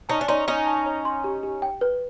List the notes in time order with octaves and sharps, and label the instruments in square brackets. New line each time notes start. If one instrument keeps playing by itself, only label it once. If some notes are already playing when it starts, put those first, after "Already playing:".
[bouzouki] C#4 D#4 [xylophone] A5
[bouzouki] D4
[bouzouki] C#4 D#4 [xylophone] C6
[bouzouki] C#4 D#4 [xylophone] C#5
[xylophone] A5
C#5
C6
G4
G4
G5
B4